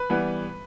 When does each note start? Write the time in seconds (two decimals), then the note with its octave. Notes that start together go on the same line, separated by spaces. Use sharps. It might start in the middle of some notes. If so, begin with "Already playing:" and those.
Already playing: B4
0.10 E3 G3 B3